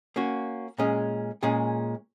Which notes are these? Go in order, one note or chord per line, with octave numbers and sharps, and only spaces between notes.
A#3 C#4 F#4
A#2 G#3 C#4 G#4
A#2 G#3 C#4 G#4